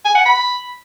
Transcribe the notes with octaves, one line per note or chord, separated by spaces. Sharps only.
G#5
F#5
B5